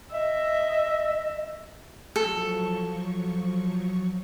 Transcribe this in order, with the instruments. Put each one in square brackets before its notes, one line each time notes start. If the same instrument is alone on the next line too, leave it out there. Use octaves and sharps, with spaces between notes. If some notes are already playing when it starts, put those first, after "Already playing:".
[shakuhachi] D#5 [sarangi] E5
[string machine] F3 F#3 C#6 [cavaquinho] A4